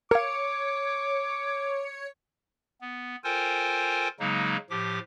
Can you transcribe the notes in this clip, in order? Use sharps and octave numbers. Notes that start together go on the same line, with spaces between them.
A#4 C#5 F5 D6
B3
F4 A4 A#4 C5 G5 G#5
C#3 F#3 G#3 A#3 D#4
A2 F3 G4 D6